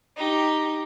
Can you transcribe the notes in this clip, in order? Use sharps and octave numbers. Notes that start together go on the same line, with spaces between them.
D#4 G4